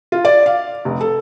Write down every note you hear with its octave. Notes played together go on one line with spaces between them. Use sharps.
F4
D5
F5
F1
A4